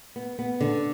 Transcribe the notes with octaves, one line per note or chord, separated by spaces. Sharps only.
B3
B3
D3